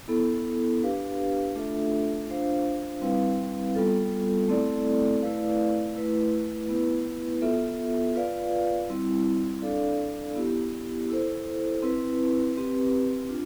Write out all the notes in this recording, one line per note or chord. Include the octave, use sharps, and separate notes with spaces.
B3 E4 A4
D4 G4 B4 F5
A3 D4 F4 A4 E5
D4 F4 C5 F5
G3 C4 E4 B4 F5
G3 B3 F4 A4
A3 C4 E4 A4 D5
A3 E4 B4 D5 F5
A3 E4 B4
B3 E4 B4
B3 F4 A4 E5
F4 B4 D5 F5
G3 C4 E4
D4 A4 D5 F5
B3 E4 G4
E4 A4 C5
C4 E4 B4
C4 G4 B4
D4 F4